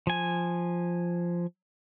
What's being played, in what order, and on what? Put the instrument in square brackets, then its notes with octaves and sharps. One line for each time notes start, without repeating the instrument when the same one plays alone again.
[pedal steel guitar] F3 G#5